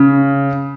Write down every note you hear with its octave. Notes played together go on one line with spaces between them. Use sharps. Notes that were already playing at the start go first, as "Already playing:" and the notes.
Already playing: C#3